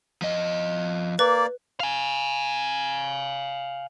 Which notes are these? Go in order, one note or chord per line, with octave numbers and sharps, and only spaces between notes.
F3 D#5
A#3 B4 D5
F5 G#5